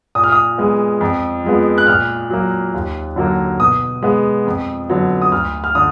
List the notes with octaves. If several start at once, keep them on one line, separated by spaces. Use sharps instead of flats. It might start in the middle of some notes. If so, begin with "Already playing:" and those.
A#2 D#6
F6
D#6
G#3 B3
F2
F3 G#3 B3
F#6
A#2 F6
F#3 A#3
D#2
D3 F#3 A#3
B2 D#6
G#3 B3
F2
D3 F#3 B3
D#6
D2 F6
F6
D3 D#6